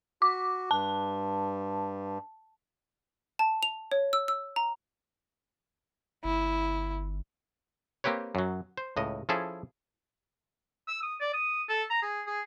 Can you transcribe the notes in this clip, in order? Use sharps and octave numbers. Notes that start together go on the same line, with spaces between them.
F#4 D6
G2 A5
A5
F7
C#5
E6
E6
A#5
G1 E4
A#3 C4 G4 B4 C#5
F#2 F#3
C5
C#2 A2 D#5
F3 C#4 E4 G#4 A4
E6
D#6
D5
D#6
A4
A#5
G#4
G#4